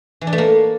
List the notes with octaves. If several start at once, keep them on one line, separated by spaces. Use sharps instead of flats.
E3
D4
A3
A#3